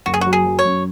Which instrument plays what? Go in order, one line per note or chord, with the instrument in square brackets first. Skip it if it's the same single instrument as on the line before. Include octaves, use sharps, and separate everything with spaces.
[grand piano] F#1 [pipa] F#4
[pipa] G#4
F#4
[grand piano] F#3
[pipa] G#4
[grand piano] F#3
[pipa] C#5
[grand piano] F#2